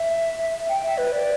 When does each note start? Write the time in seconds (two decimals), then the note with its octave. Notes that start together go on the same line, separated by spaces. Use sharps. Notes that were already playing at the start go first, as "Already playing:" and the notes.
Already playing: E5
0.68 G5
0.82 E5
0.97 B4
1.12 D5